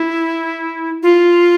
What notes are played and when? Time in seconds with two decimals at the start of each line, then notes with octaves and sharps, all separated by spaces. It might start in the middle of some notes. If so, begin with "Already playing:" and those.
Already playing: E4
1.03 F4